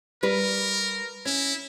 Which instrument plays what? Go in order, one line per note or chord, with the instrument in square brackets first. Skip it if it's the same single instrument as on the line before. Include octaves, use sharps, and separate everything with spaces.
[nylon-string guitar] G3 B4 [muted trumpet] A#4
[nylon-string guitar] C#4 [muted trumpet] E4